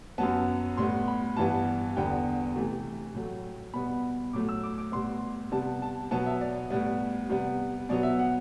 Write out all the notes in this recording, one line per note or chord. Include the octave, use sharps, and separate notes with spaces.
F#2 F#3 B3 A5
A2 G3 B3 C6
B5
G2 E3 G3 B3 A5
E2 D3 G3 B3 G5
C3 E3 A3
A2 F#3 A3
B2 G3 B3 B5
A2 F#3 A3 D6
E6
D6
D6
A2 G3 B3 C6
C3 G3 B3 A5
A5
B2 F#3 B3 A5
E5
D5
A2 G3 B3
C3 G3 B3
B2 F#3 B3 D5
E5
F#5